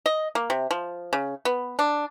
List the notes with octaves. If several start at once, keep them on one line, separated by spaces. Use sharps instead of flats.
D#5
A#3
C3
F3
C#3
B3
D4